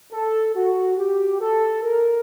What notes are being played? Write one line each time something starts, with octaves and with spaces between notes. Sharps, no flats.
A4
F#4
G4
A4
A#4